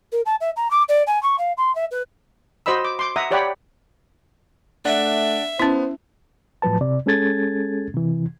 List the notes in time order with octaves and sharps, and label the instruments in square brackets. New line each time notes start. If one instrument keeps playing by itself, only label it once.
[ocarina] A#4
A5
E5
A#5
D6
D5
G#5
C#6
F5
C6
E5
B4
[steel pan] F#4 C5 D#5 B5 E6
D6
C6 D6
E5 F#5 A#5 D#6
G4 C#5 D5 F#5 G5 B5
[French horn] A3 [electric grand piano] D4 D5 F#5 [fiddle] E5
[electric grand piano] B3 [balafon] C#4 E4 [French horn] C5
[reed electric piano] A2 F3 F#3 B4 A5
C3 D5
G#3 C#4 G#4 A4 G#6 A6
C3 E3